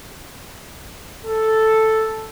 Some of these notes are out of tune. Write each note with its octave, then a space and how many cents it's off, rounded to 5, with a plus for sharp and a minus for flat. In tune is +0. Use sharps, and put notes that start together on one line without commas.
A4 +0